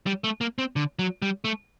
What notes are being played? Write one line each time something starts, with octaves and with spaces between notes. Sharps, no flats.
G3
A3
A#3
C4
D3
F#3
G3
A3